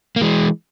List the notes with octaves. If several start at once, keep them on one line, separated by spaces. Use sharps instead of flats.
A#3
E3 G#3